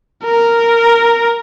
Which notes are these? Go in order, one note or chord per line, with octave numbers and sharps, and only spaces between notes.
A#4